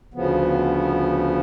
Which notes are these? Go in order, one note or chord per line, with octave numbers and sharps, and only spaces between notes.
D2 C#3 F3 B3